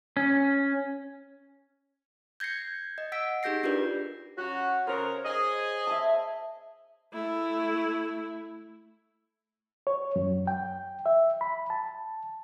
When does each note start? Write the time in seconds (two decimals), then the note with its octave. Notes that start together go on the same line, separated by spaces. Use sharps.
0.17 C#4
2.40 G6 G#6 A#6 C7 C#7
2.98 D#5
3.12 F#5 E6 B6 D7
3.43 D#4 G4 G#4 G6 A#6 C7
3.63 D4 F4 G4 A#4 B4 D5
4.38 F#2 C#4 F#4
4.87 C#3 A#4 C5 C#5
5.24 G#4 D#5
5.87 E5 A5
7.13 A3 E4
9.87 C#5
10.16 F#2
10.47 G5
11.06 E5
11.41 B5
11.70 A5